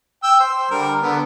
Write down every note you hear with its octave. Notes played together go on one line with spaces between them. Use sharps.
G5 E6
C5
D3 G3 A#4
D3 B3